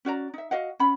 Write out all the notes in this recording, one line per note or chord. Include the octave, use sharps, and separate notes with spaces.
C#4 F#4 D5 A#5
D#4 E5
F#4 D#5 F5 F#5
C#4 F#5 B5